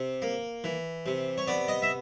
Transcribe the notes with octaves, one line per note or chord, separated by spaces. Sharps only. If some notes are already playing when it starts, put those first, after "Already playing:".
Already playing: C3
A#3
E3
C3
C#5
B3 D5
D#5
E5